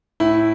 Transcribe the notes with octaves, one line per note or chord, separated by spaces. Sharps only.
A2 E4